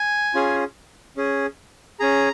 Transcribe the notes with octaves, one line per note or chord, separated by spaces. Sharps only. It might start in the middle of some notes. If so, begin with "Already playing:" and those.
Already playing: G#5
C#4 F4 G#4
C#4 G#4
C#4 G#4 A#5